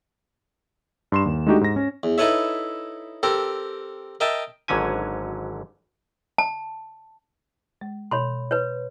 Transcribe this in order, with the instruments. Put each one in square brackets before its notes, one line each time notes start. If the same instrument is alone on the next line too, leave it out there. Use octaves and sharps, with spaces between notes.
[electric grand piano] G2 C6 E7
D#2
G#3 A3 D4 D#4 F#4 G4
G#2 A#6
C#4
[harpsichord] E2
D#4 E4 A4 B4 C#5 E5
C4 G4 A4 A#4
A#4 D#5 E5 G5 A5
[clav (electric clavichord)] G#1 G#2 D3 F#3 C#4 G#5
[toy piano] A5
[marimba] G#3
[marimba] B2 [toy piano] C#5 B5 C6
[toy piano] B4 C#5